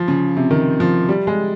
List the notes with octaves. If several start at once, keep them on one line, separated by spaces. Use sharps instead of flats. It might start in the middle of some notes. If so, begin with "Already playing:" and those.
Already playing: F3
C#3
C3
D#3
F3
G3
G#3